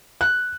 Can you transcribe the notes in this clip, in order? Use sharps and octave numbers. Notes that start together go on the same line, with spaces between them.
F#6